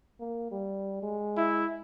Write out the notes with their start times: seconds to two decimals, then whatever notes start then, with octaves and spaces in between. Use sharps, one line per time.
0.20 A#3
0.51 G3
1.03 G#3
1.37 E4